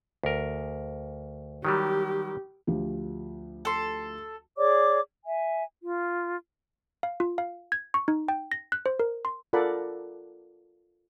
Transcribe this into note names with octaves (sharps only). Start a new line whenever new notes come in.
D2 A#4
D#3 F#3 G3 G4
D2 F3 G4
A4 C6
G#4 C#5 D5 D6
E5 G#5
F4
F5
F4
F5
G#6
C#6
D#4
G5
A#6
F#6
C5
A#4
C6
F4 A4 A#4 D5 F#5 B5